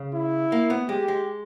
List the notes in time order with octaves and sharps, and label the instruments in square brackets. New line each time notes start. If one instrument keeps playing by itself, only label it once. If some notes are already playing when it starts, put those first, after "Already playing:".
Already playing: [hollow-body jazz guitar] C#3
[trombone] E4
[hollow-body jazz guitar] A#3
B3
[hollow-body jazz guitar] G#3 [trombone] G4
[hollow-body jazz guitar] G#3